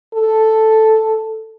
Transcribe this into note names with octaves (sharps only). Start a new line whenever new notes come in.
A4